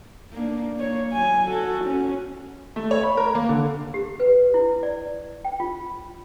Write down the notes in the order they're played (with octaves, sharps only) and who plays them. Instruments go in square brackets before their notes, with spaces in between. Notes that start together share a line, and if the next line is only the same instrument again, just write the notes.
[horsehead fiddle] A#3 D4
A#3 C#5
F#3 G#5
F#4 A4
C#4 F#4
[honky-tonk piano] A3
C#5
B5
A#4
A#3
D3
[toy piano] G4
B4
E4
D5
G5
F4